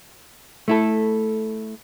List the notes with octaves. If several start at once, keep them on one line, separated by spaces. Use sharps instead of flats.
A3 E4 A4